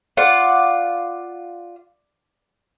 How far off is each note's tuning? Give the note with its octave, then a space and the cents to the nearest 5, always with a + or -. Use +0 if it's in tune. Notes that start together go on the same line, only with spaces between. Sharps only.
F4 +0 D5 +0 F#5 +0